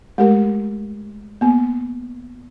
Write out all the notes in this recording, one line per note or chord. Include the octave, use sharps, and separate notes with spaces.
G#3 A3 G4 A#4
A#3 B3